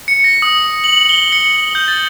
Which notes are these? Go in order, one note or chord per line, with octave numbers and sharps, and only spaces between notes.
C#7
A#6
D#6
F#7
G7
C#7
G6
A6